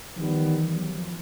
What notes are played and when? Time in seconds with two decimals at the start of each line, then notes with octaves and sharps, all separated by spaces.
0.16 D#3 F3 G3 B3
0.46 E3
0.76 F#3
0.96 F3